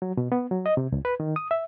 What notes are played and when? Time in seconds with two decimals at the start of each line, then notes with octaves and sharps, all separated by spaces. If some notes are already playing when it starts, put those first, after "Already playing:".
0.02 F#3
0.17 B2
0.32 B3
0.51 F#3
0.66 D#5
0.77 C3
0.92 C#2
1.05 B4
1.20 D#3
1.36 D#6
1.51 E5